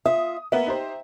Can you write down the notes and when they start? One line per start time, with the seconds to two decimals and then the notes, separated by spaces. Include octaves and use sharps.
0.05 F4 E5 D#6
0.52 A#3 B3 E5
0.67 D#4 G4 C5